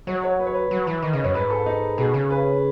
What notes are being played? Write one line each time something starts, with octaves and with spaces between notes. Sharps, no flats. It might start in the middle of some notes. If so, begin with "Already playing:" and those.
F#3 C#5
C#5
B4
C#5
B4
F#3
E3
D#3 D#5
C#3 D#5
F#2 C#5
G#2 B4
A4
D#4
B2 G#4
C#3
B4